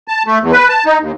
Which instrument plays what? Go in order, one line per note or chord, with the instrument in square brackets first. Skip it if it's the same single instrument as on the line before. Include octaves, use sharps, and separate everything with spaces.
[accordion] A5
A3
E2
B4
A5
D#4
D#2